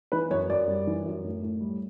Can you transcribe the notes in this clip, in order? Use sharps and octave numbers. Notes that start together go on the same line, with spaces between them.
E3 B4
F#2 C#5
F#2 D5
G3
E3
F#2
A2
A2
G3